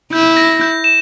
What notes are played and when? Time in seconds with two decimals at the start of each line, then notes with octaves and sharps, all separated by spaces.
0.13 E4 G6
0.37 A#6
0.61 G6
0.84 E7